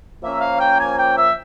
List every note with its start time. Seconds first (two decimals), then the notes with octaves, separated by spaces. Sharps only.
0.22 F3 A#3 C#4 E5
0.41 F5
0.60 G5
0.79 G#5
0.98 G5
1.18 E5